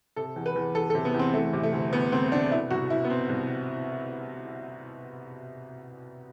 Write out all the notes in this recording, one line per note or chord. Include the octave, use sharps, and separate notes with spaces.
C3 A4
E2
B4
E2
E2 A4
A4
C3
B3
E2
C4
E3 A3
C3
A3
D2
D2 B3
D2 C4
D2 D4
B2 E4
C2 F#4
B2 E4
B3
B2 C4
C2
B2